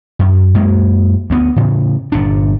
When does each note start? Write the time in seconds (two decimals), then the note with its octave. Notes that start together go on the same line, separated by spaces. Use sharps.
0.19 F#2
0.54 F#2 G#3 A#3
1.30 D2 B3
1.56 A2 C#3
2.12 G1 A#2 D4